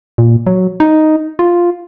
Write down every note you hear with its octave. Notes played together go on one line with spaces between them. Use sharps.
A#2
F#3
D#4
F4